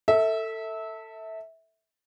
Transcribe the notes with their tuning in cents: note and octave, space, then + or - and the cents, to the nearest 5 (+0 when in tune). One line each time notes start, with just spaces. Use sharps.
A4 +20 E5 -20